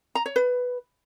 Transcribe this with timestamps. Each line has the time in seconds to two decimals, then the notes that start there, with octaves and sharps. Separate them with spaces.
0.15 A#5
0.26 C#5
0.36 B4